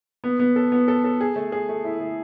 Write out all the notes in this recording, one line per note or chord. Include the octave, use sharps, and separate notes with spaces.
B3
B3
A4
B3
A4
A4
G#4
A3
G#4
A3
E4
A3